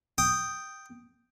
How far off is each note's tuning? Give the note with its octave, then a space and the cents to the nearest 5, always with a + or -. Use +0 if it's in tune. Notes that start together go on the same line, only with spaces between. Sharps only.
G5 +0 D#6 +0